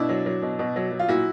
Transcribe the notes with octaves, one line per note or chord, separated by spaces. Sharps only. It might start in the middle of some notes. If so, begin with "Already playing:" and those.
Already playing: B2 D4 E4
F#3
F#3
B2
B2
F#3
F#3
F4
A#2 E4 F#4